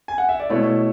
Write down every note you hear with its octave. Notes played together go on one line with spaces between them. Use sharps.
G#5
F#5
E5
D5
B2 A3 E4 C#5